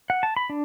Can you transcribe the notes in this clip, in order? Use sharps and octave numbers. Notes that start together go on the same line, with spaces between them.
F#5
A5
B5
D4